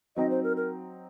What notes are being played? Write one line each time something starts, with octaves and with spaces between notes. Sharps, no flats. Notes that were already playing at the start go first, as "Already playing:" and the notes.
F#3 C4 D#4 D#5
C5
A#4
A#4